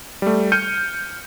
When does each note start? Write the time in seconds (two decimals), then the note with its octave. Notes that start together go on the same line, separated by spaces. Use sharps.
0.22 G3 A3
0.52 F6 G6 C#7 D#7